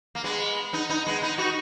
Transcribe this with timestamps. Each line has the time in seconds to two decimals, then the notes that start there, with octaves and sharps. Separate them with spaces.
0.15 A#3
0.24 G#3 B3
0.73 B3 D#4
0.90 B3 D#4
1.06 G#3 B3
1.22 B3 D#4
1.38 D#4 F#4